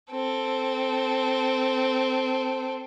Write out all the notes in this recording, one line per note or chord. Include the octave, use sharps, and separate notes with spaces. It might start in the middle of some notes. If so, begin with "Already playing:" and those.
C4 A4